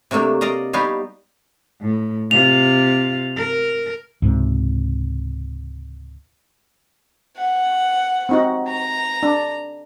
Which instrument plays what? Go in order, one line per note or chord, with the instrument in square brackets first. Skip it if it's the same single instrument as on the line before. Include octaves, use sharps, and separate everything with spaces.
[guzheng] C3 F#3 A3 A#3 D4
D5 D#5 F5 A#5
G3 B3 D#4 B4 C#5 F5
[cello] A2
[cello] C3 F4 [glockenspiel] F7
[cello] A#4
[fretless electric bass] C#2 G#2 C3
[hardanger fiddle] F#5
[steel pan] C4 D#4 F#4
[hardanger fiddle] A#5
[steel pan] D4